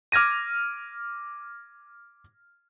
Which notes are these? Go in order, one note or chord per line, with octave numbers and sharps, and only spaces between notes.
D6 F6 G#6 A#6 D#7